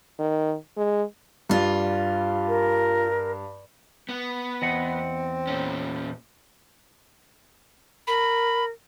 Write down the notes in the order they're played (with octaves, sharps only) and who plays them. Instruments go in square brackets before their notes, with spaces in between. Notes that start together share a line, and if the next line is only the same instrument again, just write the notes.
[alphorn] D#3
G#3
[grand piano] G2 [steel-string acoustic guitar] G3 F4
[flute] A#4
[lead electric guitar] B3
[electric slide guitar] E2 D#5 F#5 [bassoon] C4
[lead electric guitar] A#2 C#4
[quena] A#4 [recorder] B5